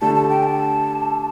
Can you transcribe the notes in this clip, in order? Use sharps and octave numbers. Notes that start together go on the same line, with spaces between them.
D3 A3 D4 G4 A5
A5
G5
A5